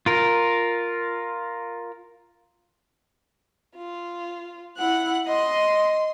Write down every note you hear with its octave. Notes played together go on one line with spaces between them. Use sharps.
F4 A#4
F4
E4 F#5 F#6
D#5 C6